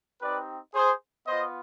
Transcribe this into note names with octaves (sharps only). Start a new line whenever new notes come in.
C4 D#4 G4 B4 D5
G#4 C5
B3 F4 C5 D#5